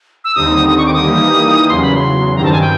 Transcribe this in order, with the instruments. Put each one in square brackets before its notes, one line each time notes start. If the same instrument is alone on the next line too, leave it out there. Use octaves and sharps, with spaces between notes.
[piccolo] E6
[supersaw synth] D#2 D3 G3 C4 D#4 [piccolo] D#6
[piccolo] D#6
C#6
D6
D#6
[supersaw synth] E3 G3 A#3 D#4 G4
[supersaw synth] E2 C#3 F#3 [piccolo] C6
[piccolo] B5
C6
[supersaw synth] G2 D#3 G3 C4 [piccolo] A#5
[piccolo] A5
G#5
G5